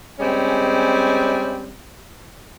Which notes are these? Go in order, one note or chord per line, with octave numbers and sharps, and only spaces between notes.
G3 G#3 C4 C#4